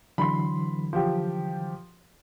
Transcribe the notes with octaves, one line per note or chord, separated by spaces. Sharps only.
D3 E3 F#3 B5 C6
F3 G4